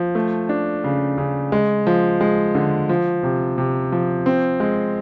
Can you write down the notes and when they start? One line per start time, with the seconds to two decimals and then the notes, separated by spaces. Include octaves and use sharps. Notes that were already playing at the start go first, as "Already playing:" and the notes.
Already playing: F3
0.15 A3
0.49 D4
0.84 C#3
1.18 C#3
1.52 G#3
1.87 F3
2.21 G#3
2.55 D3
2.89 F3
3.23 C3
3.58 C3
3.92 F3
4.26 C4
4.60 G#3